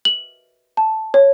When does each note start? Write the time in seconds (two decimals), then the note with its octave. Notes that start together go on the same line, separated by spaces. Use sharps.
0.05 F#7
0.77 A5
1.14 C#5